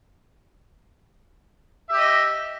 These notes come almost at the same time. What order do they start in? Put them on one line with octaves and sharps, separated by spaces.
E5 G4 D#5